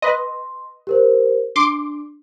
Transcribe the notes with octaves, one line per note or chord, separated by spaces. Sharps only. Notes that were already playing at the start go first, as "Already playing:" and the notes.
B4 D#5 C6
G4 A#4 C5
D4 C6 D6